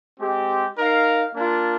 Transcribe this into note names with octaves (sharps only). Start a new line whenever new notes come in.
G#3 C4 G4
D#4 A#4 F5
A#3 D4 F4